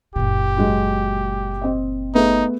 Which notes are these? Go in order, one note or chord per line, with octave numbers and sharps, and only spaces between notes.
F#1 A#2 G4
F#3 G#3 F#4
C4 D#5
A3 B3 D#4 G#4